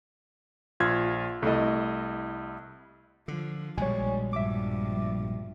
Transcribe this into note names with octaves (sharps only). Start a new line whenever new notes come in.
A#1 F4 G#6
C2 A3 E4 D#5
D3 F3
A#1 B2 G3 G#3 C#5 G#5
G2 F3 E5 D6